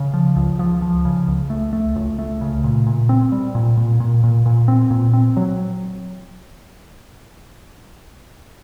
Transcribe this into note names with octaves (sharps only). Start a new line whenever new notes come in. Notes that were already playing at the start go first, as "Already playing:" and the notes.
Already playing: C#3
F3
C#2
F3
F3
C#3
C#2
A3
A3
C#2
A3
C#3
A#2
A#2
C4
G3
A#2
A#2
A#2
A#2
A#2
C4
A#2
C4
F#3